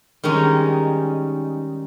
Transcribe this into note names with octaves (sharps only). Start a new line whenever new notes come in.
D#3 G3 G#3 C#4 D#4